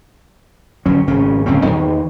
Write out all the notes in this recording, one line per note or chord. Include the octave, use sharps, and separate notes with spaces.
G1 F#3 C#4
G#1 C#3 C#4
D1 C#2 C4 C#4
E2 D#3